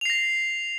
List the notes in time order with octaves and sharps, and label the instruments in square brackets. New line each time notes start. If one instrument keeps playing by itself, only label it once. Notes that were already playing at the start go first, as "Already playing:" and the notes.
[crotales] F7
C7
A#6